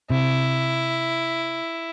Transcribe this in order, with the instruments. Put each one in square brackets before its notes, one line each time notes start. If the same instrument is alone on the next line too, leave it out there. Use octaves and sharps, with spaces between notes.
[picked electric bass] C3 [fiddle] E4